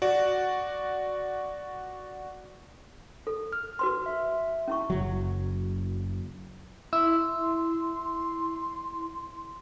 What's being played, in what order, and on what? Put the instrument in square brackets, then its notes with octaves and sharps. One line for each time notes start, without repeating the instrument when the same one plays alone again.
[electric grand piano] F#4 D5
[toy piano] A4
[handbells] F6
[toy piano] F#4 B4 C6
[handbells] E5
[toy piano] C#4 E4 C#6
[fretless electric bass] F#1 F#3
[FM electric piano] E4 [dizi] C6 [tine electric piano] E6